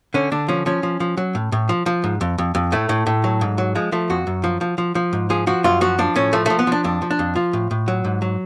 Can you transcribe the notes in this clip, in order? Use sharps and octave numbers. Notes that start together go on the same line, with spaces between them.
D3 C#4
D3 D4
F3 C#4
F3 C#4
F3
F3
F#3
A2
A2
F3
F3
G#2
F2
F2
F2
A2 A3
A2
A2
F#3
G#2
F#3
F3 G#3
F3 A3
F2 F#4
F#2
F3
F3
F3
F3
G#2
F3 G#4
F3 F#4
F#2 F4
F3 F#4
F3 D4
A2 C#4
F3 A3
F3 A3
B3
F3 D4
F2 D4
F3
D4
F2
F3 F4
A2
A2
F#3
G#2
F#3